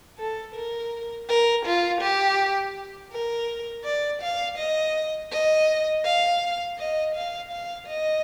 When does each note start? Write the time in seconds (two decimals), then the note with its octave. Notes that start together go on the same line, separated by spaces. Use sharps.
0.19 A4
0.55 A#4
1.29 A#4
1.66 F4
2.01 G4
3.12 A#4
3.85 D5
4.22 F5
4.58 D#5
5.32 D#5
6.05 F5
6.78 D#5
7.15 F5
7.51 F5
7.87 D#5